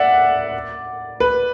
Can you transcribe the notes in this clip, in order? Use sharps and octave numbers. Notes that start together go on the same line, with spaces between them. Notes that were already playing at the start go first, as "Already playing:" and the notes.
Already playing: D5 E5 F#5
B4